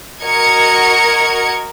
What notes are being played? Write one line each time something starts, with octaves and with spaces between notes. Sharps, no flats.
F#4 A#4 D#5 G#6 C#7